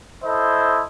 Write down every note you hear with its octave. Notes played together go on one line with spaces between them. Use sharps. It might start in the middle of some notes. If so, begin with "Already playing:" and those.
E4 A4 C5 D#5